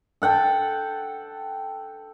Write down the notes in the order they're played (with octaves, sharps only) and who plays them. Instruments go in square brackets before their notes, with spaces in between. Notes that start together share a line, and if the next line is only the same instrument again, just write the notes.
[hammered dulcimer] A4 F#5 G5 A5